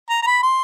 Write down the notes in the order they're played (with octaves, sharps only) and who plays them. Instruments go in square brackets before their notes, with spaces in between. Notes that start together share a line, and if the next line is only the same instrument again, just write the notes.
[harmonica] A#5
A#5
B5
C6